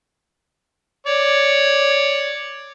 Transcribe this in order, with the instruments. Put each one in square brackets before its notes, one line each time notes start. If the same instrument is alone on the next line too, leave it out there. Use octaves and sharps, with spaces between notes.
[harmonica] C#5 D5